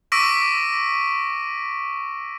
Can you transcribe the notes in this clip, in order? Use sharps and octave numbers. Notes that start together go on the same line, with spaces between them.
C#6 D6 E6 A#6 B6 D7